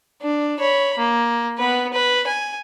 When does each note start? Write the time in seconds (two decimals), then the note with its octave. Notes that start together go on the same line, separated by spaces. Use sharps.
0.21 D4
0.59 C#5 B5
0.98 A#3
1.59 B3 B4
1.93 B4
2.27 G#5